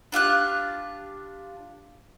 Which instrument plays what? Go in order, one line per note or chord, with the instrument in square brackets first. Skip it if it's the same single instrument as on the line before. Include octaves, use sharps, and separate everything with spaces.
[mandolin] D4 F4 G4 F#6